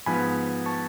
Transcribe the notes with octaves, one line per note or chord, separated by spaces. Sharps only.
G#2 F3 B3 G#5 B5
A5 C#6